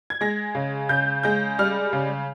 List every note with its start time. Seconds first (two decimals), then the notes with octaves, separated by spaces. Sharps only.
0.10 G#6
0.21 G#3 A#6
0.55 C#3
0.89 C#3 G6
1.23 G#3 G6
1.59 G3 F6
1.93 C#3